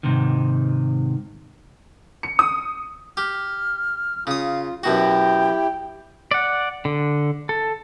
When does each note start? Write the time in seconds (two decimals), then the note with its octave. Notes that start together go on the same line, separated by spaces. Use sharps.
0.03 G#2 C3 D#3
2.23 C#7
2.39 D#6
3.17 G4 F6
4.27 C#3 F4 F5 D#6
4.84 F#2 B2 E4 F#4 G4 G5
6.31 D5 F#5
6.85 D3
7.49 A4